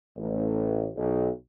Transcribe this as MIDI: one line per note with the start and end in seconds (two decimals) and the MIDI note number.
0.17 0.89 33
0.97 1.30 35